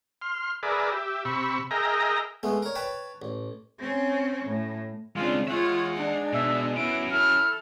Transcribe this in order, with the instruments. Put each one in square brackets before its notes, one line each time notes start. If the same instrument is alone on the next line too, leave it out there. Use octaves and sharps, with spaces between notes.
[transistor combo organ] C6 F6
G#4 A#4 B4 D5 E5
G4 E5
C3 B5 C#6 E6
G#4 A#4 D#5 E5 G5 A#5
[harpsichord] G#3 A3 B3
A#4 C#5
B4 C#5 G5 A5 B5
A1
[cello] C4 C#4
A2
[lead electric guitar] C#3 G#3 [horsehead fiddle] C4 D4 [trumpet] F4
[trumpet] G#3 [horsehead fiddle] F4 C#5 [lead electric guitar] E5 F#5
[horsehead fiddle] D4 D#4
[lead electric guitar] B2 [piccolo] E5
[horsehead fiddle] B3 [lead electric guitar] C#4 F#4 [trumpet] E4 [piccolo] D7
[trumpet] E4 [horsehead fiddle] A4 [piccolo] F6